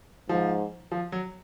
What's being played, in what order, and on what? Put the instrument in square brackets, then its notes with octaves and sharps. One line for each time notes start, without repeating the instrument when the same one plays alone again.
[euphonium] G#2 [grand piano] F3
[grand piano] F3
F#3